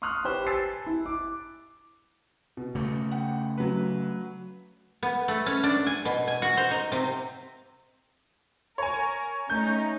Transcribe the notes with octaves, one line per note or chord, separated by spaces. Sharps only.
C6 C#6 D#6 F6 F#6
G4 B4 C5
G#5 A5 E6 A6 C7
E4
D6
B2
C#3 A3
F#5 G5
F#3 B4
B3
A3
C#4
D4
G#5
B2
G#5
F#4
C5
D#4
C3
A#4 C#5 G#5
A3 C#4 D#4 G6